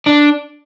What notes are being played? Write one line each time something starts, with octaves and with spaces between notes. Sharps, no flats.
D4